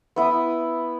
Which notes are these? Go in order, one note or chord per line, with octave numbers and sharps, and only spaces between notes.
B3 E4 D#6